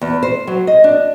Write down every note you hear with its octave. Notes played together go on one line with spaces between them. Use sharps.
E2
C5
F#3
D#5
D4